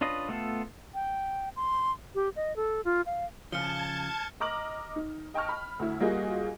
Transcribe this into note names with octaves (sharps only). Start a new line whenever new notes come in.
C#4 D4 F4 B4 D#5
A3 B3 F4 A4
G5
C6
G4
D#5
A4
F4
F5
C#3 F3 A5 F6 G#6 C#7 G7
D#5 A#5 D6 F6 F#7
D#4
D#5 G5 A5 C#6 F6
B5
D2 E4
G3 A#3 F4 F#4 G#4 D#5